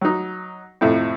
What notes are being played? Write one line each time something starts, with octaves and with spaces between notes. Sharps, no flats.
F#3 D#4
F2 A2 C3